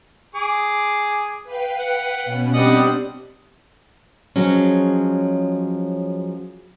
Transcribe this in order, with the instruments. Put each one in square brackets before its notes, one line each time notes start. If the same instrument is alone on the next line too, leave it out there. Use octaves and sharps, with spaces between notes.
[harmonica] G#4 D6
[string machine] B4 F5 G5
[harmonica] F#5
[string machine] B2 B3 C#4
[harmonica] G3 D#5 F#5 [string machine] C4 D4 G4
[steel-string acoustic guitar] F3 F#3 G#3 C#4